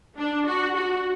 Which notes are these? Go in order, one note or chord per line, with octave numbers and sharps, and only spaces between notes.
D4
F#4
F#4